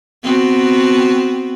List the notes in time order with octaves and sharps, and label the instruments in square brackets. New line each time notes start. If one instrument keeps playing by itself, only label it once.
[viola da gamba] B3 C4 F#4